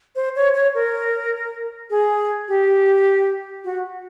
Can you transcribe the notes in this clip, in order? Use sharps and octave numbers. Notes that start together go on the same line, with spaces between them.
C5
C#5
C#5
A#4
G#4
G4
F#4